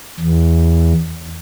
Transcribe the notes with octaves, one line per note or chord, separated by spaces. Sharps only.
E2